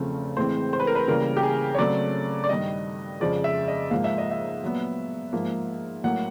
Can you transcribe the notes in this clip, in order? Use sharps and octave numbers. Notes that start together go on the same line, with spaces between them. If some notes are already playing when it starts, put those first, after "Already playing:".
Already playing: E2 C#3 F3 A3 C4
A2 E3 G#3 C4 C5
C5
B4
A#4
B4
C#3 E3 G3 A#3 A#4
G4
G#4
C#5
C#3 F#3 A3 C4 D5
D5
G2 D#3 G3 D#5
F2 C#3 F3 G#3 D5
E5
D#5
G#2 F3 A#3 F5
E5
D#5
E5
A#2 F#3 B3
G#2 F3 A#3
A2 F#3 A#3 F#5